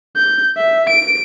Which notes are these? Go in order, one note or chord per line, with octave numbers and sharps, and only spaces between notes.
G6
E5
D7